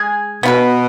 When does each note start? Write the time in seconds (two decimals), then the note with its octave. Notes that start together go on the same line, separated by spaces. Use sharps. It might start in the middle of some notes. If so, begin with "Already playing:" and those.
Already playing: G#3 G#4
0.43 B2 B3 F4 B4